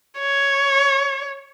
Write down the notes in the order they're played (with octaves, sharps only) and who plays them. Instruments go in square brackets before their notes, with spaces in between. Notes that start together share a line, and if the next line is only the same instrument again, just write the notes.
[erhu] C#5